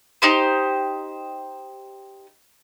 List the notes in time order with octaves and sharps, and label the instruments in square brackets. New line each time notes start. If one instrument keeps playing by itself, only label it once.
[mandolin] D#4 G4 C5